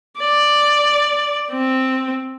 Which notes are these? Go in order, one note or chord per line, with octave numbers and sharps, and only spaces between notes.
D5
C4